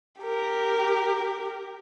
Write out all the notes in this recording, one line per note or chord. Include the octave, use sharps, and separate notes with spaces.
G4 A#4